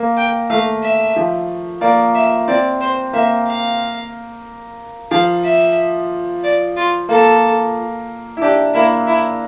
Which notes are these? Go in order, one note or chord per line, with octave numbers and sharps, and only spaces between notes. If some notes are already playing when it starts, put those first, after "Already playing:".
Already playing: A#3
G5
A3 F5
E5
F3
A#3 D5
E5
C4 D5
C5
A#3 E5
F5
F3 F5
E5
D5
F4
A#3 A4
E4
D4 G4
A#3 E4
E4